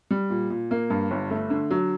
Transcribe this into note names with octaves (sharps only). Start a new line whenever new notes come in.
G3
A#2
A#2
A#3
G2
G1
A3
D3
F#3